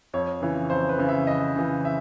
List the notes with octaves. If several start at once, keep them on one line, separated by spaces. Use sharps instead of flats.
F2 C#5
C#3 E3
F2 C5
B4
C#3 E3
E5
F2 D#5
C#3 E3
E5